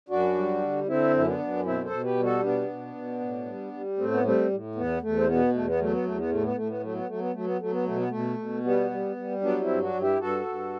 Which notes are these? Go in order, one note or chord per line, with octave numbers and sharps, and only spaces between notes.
F#2 D4 F#4
G3
D3
D3 C4 E4
F#2 E4
B3 D4
F#2
B2 C4 E4
A4 C5
B2
G4 B4
G3
F#4 A4
B2 B3 D4
B2
B2
A2
G3
G3
A2 A3 C4
B3
G3 A3 C4
A2
E2 B3
E2 A3
C4
B2 B3
E2 A3
B3
F#3 A3
B3
E2 A3
B3
A2 A3
B3
A2 A3
B3
F#3 A3
B3
F#3 A3
B3
F#3 A3
B3
F#3 A3
B3
B2 A3
B3
B2 A3
B2
G3 B3
G3
G3
F#3 B3 D4
C4 E4
G2
D4 F#4
G2
E4 G4
G2 F#4 A4
G2